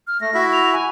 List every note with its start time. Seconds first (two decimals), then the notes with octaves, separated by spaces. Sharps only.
0.07 F6
0.21 A3 A#6
0.34 E4 F#4 E5
0.53 F7
0.73 G#5